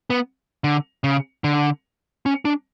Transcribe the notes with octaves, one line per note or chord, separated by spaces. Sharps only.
B3
D3
C#3
D3
C#4
D4